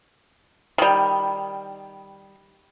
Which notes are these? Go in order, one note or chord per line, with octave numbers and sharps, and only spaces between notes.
D#3 G3